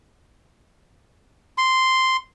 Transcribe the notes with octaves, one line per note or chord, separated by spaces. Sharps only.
C6